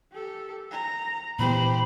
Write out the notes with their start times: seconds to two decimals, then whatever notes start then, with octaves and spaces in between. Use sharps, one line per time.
0.13 G4 A4
0.71 A#5
1.39 A#2 E3 B3 G4 C5 B5